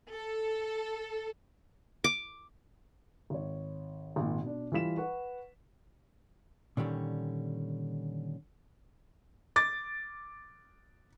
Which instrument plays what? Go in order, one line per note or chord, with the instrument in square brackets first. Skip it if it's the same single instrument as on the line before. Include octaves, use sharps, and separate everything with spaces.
[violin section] A4
[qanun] D6
[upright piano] G#1 C#5
G#1 A#2
B2 D4
E3 G3 F4 B6 E7
B4 F#5 C#6
[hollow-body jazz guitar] A#2 D3 D#3 G3 C#4
[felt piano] D6 A6